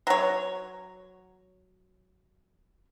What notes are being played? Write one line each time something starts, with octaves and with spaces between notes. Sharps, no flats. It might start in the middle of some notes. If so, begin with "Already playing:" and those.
F#3 C#5